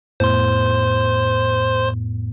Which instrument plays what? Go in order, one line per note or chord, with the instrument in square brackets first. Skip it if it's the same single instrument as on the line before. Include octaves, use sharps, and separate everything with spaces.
[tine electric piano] F2 A2 B3 [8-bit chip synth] C5 C6